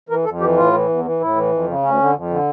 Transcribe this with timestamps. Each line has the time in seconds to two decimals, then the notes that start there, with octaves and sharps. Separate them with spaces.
0.09 E3 A#4
0.25 F2 A4
0.40 E3 G4
0.57 A2 F4
0.73 E3
0.89 E2
1.04 E3
1.20 A2 E4
1.36 E3
1.51 F2
1.67 C#3
1.83 D2 C#4
1.99 D3
2.15 F2
2.30 D3